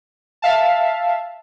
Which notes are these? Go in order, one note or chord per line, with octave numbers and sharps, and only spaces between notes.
E5 F5 A5